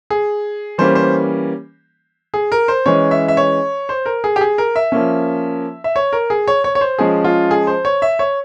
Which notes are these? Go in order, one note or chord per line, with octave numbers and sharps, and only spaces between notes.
G#4
E3 G3 A#3 C#4 C5
C5
G#4
A#4
C5
E3 G#3 C#4 C#5
E5
E5
C#5
C5
A#4
G#4
G4
G#4
A#4
E5
F3 A#3 C#4
E5
C#5
A#4
G#4
C#5
C#5
C#5
C5
F3 G#3 C#4 G#4
F4
G#4
C5
C#5
E5
C#5